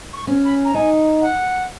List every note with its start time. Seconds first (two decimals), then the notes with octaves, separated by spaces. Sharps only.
0.13 C#6
0.27 C#4
0.44 B5
0.64 A#5
0.74 D#4 G#5
1.21 F#5